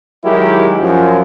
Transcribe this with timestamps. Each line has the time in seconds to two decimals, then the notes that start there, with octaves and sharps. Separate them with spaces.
0.25 D#3 F#3 G#3 E4 G4 A#4
0.79 F#2 F3